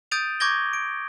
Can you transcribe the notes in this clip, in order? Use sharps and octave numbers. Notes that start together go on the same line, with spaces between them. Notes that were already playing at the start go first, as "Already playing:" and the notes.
D#6 G6 A6 D7 D#7 F7
C#6 D6 G6 G#6 A#6 G7
D7